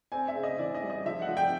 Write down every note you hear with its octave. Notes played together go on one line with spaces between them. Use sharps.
C4 G#5
E5
C#3
D#5
E3 D5
D#5
G3
D#5
F3 E5
F#5
F3
G5